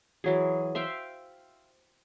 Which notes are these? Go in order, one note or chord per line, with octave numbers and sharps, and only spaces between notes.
E3 F#3 G#4
C5 E5 F5 G5